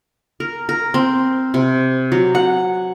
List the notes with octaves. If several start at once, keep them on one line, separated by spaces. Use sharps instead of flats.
A#4
A#4
C4
C3
F#3
F#5